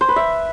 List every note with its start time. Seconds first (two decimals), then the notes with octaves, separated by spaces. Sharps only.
0.01 C5
0.08 B4
0.16 E5